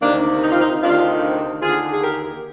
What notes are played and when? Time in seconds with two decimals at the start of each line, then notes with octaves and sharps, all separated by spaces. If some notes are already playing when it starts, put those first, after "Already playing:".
0.01 D2 C3 D#3 A#3 D4
0.42 D#4
0.50 F4
0.59 C4 D#4
0.81 D2 C3 D#3 D4 F4
1.62 D#2 D3 F4 G#4
1.92 G#4
2.03 G4 A#4